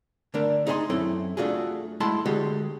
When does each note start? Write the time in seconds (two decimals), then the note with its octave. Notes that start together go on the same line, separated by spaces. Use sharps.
0.34 D3 A3 D4 A#4
0.67 D#4 G#4 C5 E5 G#5 C6
0.90 F#2 C4 E4 A4 C#5
1.37 A3 D4 F4 F#4 G#4
2.00 G#3 A3 E4 F#5 A5 C6
2.26 D3 G#3 F#4 G4 A4